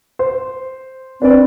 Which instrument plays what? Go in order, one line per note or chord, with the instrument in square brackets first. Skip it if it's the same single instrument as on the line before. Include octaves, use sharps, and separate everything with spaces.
[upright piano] C5
[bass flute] C4 [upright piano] D4 B4 D5